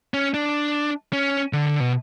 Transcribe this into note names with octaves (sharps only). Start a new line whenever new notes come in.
C#4
D4
C#4
D3
B2